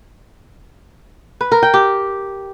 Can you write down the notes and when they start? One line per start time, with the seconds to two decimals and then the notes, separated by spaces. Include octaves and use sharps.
1.41 B4
1.52 A#4
1.63 G5
1.74 G4